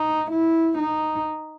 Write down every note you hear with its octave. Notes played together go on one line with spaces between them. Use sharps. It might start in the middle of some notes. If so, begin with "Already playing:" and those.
Already playing: D#4
E4
D#4